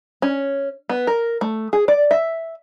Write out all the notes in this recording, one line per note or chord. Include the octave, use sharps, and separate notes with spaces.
C#4
B3
A#4
A3
G#4
D5
E5